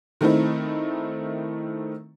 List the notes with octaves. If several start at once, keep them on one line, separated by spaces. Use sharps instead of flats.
D#3 A3 C4 D#4 E4